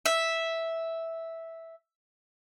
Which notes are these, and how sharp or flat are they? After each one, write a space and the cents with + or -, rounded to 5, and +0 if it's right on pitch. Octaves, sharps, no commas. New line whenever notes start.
E5 -5